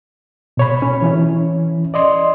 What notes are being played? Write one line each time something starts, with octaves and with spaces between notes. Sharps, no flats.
B2 C#5 B5
C#4
E3 C#4 E4
D5 D#5 C6